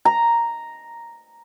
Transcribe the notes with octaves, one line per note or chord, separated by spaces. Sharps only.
A#5